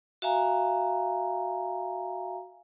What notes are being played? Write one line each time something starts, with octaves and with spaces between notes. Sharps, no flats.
F#4 E5 F5 G#5 A#5